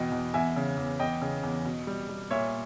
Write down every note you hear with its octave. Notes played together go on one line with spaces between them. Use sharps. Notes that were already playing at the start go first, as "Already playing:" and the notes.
Already playing: E2 B2 D#5 G5
E2
E2 E5 G#5
C#3
E2
E2 D#5 G5
C#3
E2
B2
G3
G3
A#2 C#5 E5